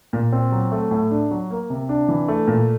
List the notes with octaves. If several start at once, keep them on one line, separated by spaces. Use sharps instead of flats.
A#2
C4
F#3
A3
A2
D4
F#3
A#3
C3
D4
E3
A3
A#2